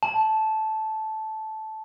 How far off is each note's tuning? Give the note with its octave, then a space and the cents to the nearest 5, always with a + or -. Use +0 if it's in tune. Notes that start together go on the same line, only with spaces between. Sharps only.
A5 -10